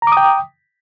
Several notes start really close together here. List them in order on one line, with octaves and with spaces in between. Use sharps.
A#5 D6 D#6 G5